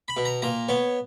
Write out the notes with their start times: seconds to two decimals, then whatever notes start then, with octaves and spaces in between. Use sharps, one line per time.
0.08 B5
0.17 B2
0.25 A#5
0.42 A#2 A#5
0.69 B3 C#5